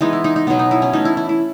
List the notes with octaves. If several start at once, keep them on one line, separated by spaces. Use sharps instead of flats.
E3 G#3 B3 D#4
E4
D#4
D#4
B2 F#3 B3 D#4
D#4
E4
C#4
E3 A3 D#4
E4
E4
E4